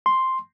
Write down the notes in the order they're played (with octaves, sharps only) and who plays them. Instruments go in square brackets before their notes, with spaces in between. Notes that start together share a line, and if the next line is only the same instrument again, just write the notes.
[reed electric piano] C6